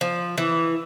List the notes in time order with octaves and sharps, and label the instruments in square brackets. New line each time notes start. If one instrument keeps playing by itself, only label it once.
[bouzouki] F3
E3